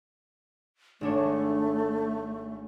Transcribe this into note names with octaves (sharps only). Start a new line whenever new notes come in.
G#1 A3 D4 C#5